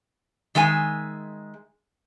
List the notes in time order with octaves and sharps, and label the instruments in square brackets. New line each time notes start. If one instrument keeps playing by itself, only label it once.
[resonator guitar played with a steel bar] D#3 G#3 E5 G#5